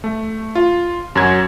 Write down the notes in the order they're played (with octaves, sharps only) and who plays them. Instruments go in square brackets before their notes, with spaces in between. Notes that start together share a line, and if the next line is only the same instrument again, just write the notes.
[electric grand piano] A3
F4
F#2 F#3 G#6